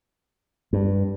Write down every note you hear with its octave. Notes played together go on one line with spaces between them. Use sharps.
G2